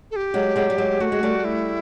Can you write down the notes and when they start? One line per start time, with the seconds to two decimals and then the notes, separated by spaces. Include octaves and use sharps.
0.11 A4
0.16 G4
0.34 F#3 G#3
0.56 F#3 G#3
0.70 G3
0.78 F#3 G#3
1.00 A3 F#4
1.12 G#3
1.23 G3 A3
1.44 E4